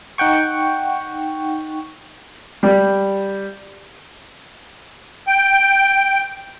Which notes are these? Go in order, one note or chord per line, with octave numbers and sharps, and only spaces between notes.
D#4 F#5 G5 C#6
G3
G5